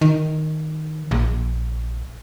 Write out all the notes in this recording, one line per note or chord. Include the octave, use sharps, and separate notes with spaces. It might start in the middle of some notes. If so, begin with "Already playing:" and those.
D#3
A#1